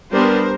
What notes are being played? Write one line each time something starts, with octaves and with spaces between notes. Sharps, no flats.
G3 B3 D4 A#4 C5